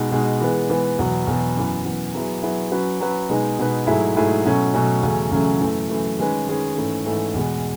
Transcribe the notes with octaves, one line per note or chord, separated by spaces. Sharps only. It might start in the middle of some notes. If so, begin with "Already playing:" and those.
Already playing: B2 G#3 D#4
B2 G#3 D#4
E3 G#3 B3
E3 G#3 B3
E2 B2 F#3 B3
E2 B2 F#3 B3
F#2 E3 B3
F#2 E3 B3
F#3 B3 E4 G#4
F#3 B3 E4 G#4
F#3 C#4 F#4 B4
F#3 C#4 F#4 B4
B2 G#3 D#4 G#4 B4
B2 G#3 D#4 G#4 B4
G#2 F#3 A3 E4 G#4
G#2 F#3 A3 E4 G#4
B2 F#3 A3 C#4
B2 F#3 A3 C#4
E2 C#3 F#3 A3 C#4
E2 C#3 F#3 A3 C#4
F#2 E3 A3
F#2 E3 A3
D#3 G#3 C#4 G#4 B4
D#3 G#3 C#4 G#4 B4
G#2 E3 A3 C#4
G#2 E3 A3 C#4
E2 B2 G#3